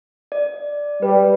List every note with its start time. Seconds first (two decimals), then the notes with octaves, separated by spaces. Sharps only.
0.32 D5
1.02 G3 B4